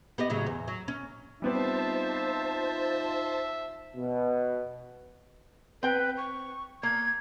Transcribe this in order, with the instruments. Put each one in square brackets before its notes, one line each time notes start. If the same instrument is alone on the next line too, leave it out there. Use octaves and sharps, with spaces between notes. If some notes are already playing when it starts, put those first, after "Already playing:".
[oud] B3 G4 D#5
A2 C#3 F#3
E2
F#3
C#4
[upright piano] G3 B3 C4 [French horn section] D#4 F4 [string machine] C5 A5 [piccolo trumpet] E5
[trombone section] B2
[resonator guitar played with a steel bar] C4 G5 [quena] B4
[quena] C#6
[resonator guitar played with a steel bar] A#3 [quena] G#6